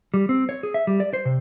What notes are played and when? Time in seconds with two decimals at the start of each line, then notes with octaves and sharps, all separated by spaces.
0.14 G3
0.29 C4
0.49 C#5
0.63 G#4
0.74 E5
0.87 G3
1.00 D5
1.13 C5
1.25 C3